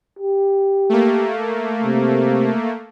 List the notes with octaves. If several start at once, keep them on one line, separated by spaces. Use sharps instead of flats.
G4
A3 A#3
C3